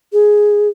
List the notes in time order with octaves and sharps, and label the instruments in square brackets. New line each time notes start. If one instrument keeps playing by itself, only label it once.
[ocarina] G#4